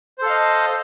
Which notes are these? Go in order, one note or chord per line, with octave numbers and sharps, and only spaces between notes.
A4 C5 D#5 F5